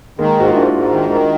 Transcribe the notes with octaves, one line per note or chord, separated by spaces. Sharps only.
D#3 G#3 A#3
G#2 F#4
F4
G#2 D4 E4
G#2
D#3
D#3